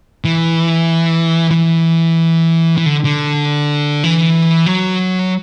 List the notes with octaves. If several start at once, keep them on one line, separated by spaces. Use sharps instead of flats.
E3
E3
E3
D3
D3
E3
F#3